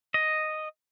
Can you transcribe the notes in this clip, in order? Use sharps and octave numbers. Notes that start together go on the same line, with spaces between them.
D#5